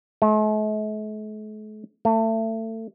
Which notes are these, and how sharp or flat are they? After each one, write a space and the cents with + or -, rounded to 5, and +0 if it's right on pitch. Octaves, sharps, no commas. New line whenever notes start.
A3 -45
A3 +30